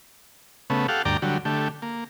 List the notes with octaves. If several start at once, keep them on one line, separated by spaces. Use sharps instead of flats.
C#3 A3 B3
G4 A4 F5 F#5
D2 G2 D5 G5 A#5
D3 F#3 G3
D3 A3 G4
A#3